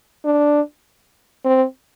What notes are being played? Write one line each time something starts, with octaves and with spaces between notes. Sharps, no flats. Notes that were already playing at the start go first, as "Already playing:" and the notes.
D4
C4